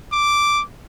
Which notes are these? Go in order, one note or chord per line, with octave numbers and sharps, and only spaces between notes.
D6